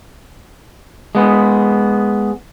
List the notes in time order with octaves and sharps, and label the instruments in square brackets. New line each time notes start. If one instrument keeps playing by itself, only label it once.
[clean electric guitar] G#3 B3